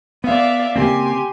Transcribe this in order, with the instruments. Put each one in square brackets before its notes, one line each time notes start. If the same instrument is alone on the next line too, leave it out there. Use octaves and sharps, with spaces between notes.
[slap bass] B3 [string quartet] D5 E5 F5
[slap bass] C#3 A#3 C4 [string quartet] G4 G#5 C6